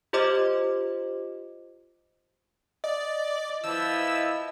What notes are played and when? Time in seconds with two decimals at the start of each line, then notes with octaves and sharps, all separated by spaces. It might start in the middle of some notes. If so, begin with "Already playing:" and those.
0.13 F4 G4 C5 D#5 D6
2.84 D5 D#5
3.64 F3 B3 E4 E6